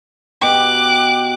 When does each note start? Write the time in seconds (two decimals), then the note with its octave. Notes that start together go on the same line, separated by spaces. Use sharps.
0.42 B2 G4 D6 F#6